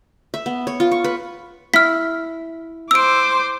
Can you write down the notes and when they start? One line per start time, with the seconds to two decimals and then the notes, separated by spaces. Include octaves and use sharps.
0.34 E5
0.46 B3
0.67 C#5
0.80 F4
0.91 C#6
1.04 B4
1.74 E4 F6 B6
2.91 C5 D6 E6 D7